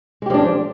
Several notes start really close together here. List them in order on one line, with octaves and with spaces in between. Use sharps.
G#3 G4 F3 D4